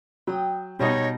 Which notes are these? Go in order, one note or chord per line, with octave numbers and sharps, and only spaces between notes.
F#3 G5 D#6
B2 G3 D#4 C#5 D#5